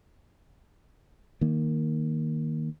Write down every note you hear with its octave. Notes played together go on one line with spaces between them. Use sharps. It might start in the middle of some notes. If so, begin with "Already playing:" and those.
D#3 A#3